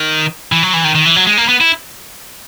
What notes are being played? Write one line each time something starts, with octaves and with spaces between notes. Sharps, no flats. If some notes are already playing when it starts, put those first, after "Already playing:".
Already playing: D#3
E3
F#3
E3
D#3
D#3
E3
F#3
G#3
A#3
B3
E4